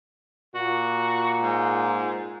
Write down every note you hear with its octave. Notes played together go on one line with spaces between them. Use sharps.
A#2 F#4
G#2